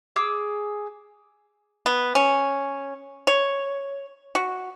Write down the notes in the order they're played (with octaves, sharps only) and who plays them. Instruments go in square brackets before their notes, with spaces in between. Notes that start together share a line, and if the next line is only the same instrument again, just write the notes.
[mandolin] G#4 D6 E6
[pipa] B3
C#4
C#5
F#4